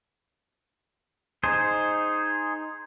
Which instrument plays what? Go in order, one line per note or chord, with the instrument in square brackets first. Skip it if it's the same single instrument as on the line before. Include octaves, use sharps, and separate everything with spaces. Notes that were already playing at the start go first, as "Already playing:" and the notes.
[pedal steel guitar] D#4 G#4 C5